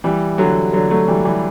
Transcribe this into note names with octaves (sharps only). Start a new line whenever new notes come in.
E3 G3
D3 F#3
D3 F#3
F#3 A3
E3 G3
E3 G3